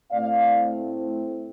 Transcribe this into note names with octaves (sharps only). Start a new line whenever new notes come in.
A2 A3 C4 D5 F5